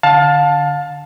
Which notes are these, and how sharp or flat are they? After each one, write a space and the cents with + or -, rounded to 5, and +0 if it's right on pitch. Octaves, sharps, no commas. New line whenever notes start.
D3 +0 F5 +30 A5 +0